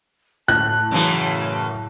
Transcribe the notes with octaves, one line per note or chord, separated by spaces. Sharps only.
A2 A5 F#6
F#2 C#3 E3